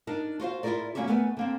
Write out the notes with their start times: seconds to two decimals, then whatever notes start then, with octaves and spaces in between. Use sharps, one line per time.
0.07 D4 D#4 A#4
0.40 F4 F#4 C5 F5
0.63 E4 F4 G4 G#4 A#4 D5
0.95 G3 A#3 C#4 F#4 G4 E5
1.08 A3 B3 A#4 B4 G#5
1.37 D3 A#3 C4